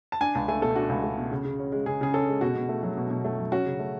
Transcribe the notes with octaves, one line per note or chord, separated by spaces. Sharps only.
A5
D4 G#5
C#2 A5
A3 G#5
B2 A4
D4 F#4
C#2
A3
B2
C#3
C#3
C#4
G#3
C#3 G#4
C#3 G#4
C#4 A4
G#3
B2 F#4
B2
A3
F#3
B2
B2
A3
F#3
C#4 F#4
C#3
A3